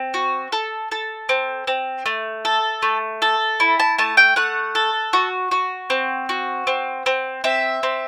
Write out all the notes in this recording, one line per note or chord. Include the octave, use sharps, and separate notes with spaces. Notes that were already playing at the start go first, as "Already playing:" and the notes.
Already playing: C4
F#4
A4
A4
C4
C4
A3
A4
A3
A4
E4
A5
A3 A5
G5
A3 F#5
A4
F#4
F#4
C4
F#4
C4
C4
C4 E5
C4